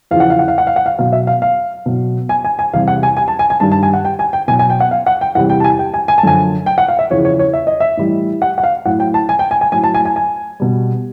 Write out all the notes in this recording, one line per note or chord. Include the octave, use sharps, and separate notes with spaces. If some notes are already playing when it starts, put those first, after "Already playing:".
E2 C#3 F3 F5
F#5
F5
F#5
F5
F#5
F5
F#5
F5
B2 F#3 F5
E5
F5
F5
B2 F#3
G#5
G#5
G#5
E2 C3 E3 G3 F5
F#5
G#5
G#5
A5
G#5
G#5
G2 D#3 G3 A5
A5
G#5
F#5
G5
G#5
G5
B2 F#3 G#5
G#5
G5
F#5
F5
F#5
G5
E2 C3 E3 G3 F#5
G5
A5
G#5
G5
G#5
G#5
A5
F#2 D3 F3 G#5
G5
F#5
F5
E5
E2 C#3 F3 C#5
C#5
C#5
E5
D#5
E5
A2 E3 G3
F#5
F#5
F5
A2 F#3 F#5
G5
A5
G#5
G5
G#5
G#5
A2 F#3 G#5
A5
G#5
G#5
G#5
B2 G3